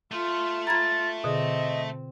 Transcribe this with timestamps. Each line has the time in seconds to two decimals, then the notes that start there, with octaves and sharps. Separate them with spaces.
0.12 A3 F4
0.67 F4 A#5 B5 G#6 A6
1.24 B2 D3 C4 G#4 D#5